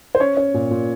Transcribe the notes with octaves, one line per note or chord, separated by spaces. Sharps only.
C5
C#4 C#5
C#4
A#2
A#2